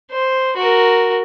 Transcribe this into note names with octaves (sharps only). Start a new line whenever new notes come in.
C5
F#4 A#4